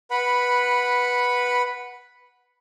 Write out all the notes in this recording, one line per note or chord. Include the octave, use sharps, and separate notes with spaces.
B4 F#5 B5